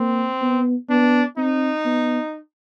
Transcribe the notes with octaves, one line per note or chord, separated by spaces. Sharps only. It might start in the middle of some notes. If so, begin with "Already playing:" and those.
Already playing: A#3 C4
B3
B3 D4
C4 D#4
B3